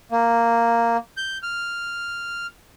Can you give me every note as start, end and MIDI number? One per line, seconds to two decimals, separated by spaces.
0.12 0.97 58
1.17 1.38 91
1.43 2.47 89